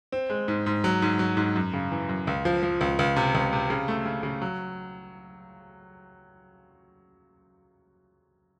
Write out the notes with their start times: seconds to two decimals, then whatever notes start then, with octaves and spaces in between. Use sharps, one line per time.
0.12 C4
0.30 G#3
0.48 G#2
0.66 G#2
0.84 F#3
1.02 G#2
1.19 F#3
1.37 G#2
1.56 F#2
1.74 C#3
1.92 E3
2.09 F#2
2.27 C#2
2.45 F3
2.63 F3
2.81 C#2
2.99 C#2
3.16 C3
3.35 C#2
3.53 C3
3.70 C#3
3.88 A3
4.06 C#3
4.23 C#3
4.42 F#3